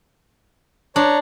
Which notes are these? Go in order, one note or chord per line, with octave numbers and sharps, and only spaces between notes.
D4 C#5 A#5 C#6